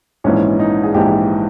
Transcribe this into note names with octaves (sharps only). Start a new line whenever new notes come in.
A#1 G#2 E3 C#4
D#4
G#4
A#1 G#2 E3 G4